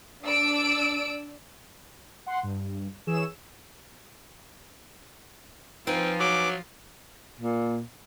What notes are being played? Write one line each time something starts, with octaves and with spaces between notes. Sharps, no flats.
D4 D5 E6 D7
F#5 C6
G2
E3 G#4 C#5 E6 E7
F3 C4 D#4 F4 B4 G#5
F#3 D6
A#2